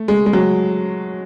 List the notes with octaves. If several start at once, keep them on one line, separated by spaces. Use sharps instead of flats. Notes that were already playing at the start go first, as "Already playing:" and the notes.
Already playing: A3
G#3
G#3
F#3